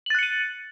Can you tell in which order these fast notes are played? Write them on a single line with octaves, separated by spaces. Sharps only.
F#7 A6 F#6 C#7 D#7